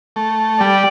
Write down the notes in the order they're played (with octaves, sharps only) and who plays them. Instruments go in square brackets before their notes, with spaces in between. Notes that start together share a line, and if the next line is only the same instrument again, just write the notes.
[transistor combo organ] A3
[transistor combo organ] G3 [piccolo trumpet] D5